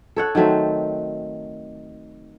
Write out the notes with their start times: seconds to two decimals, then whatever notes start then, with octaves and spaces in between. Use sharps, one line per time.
0.16 A4 C#5 F#5
0.35 D#3 F#3 A3 C4